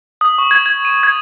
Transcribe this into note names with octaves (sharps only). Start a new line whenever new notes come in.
D#6
C#6
G#6
G#6
D#7
G#6